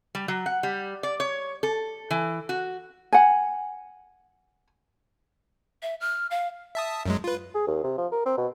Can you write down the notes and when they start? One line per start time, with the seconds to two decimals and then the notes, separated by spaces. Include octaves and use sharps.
0.15 G3
0.28 F#3
0.46 F#5
0.63 G3
1.03 D5
1.20 C#5
1.63 A4
2.11 E3
2.49 F#4
3.13 F#5 G#5
5.83 E5
6.01 F6
6.31 F5
6.75 E5 A5 D#6
7.06 F#2 F#3 G#3
7.24 F4 B4
7.54 G#4
7.67 D#2
7.83 C3
7.97 F3
8.12 A#4
8.26 C4
8.37 B2